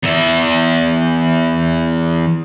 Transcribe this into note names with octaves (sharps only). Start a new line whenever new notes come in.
E2 E5